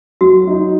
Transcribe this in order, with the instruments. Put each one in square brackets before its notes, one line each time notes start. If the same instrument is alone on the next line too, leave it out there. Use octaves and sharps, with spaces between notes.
[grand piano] F#3 [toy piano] F#4
[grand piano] D#4